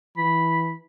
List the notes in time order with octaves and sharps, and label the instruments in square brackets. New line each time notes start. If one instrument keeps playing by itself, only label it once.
[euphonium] E3 [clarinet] B5